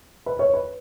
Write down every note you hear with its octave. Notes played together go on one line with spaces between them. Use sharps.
B4
C#5
B4